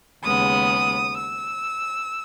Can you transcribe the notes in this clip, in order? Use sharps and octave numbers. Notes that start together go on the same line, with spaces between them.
D#2 C#3 G#3 B3 D#6
E6